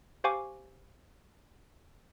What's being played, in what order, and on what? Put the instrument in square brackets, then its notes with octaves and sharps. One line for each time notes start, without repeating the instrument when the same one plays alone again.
[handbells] G4 C5 F5 G#5 C#6 D6